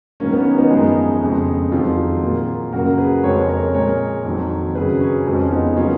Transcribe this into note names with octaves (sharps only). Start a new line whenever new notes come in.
G#2 D#3 F#3 A#3 C#4
B3
C#4
B3 D#4
F#2 F3 G#3
F2 C#3 G#3
F2 D#3 F#3 F4 G#4
A#2 F#3 A#3
F#2 C#3 F#3 A#3 F#4 A#4
G#4 B4
F2 C#3 G#3 A#4 C#5
A#4 C#5
A#2 G#3 A#4 C#5
F2 D#3 F#3
F#2 C#3 F#3 G#4 B4
C#4
F2 F3 G#3 C#4
B3 D#4
C#3 F#3 A#3 C#4 F4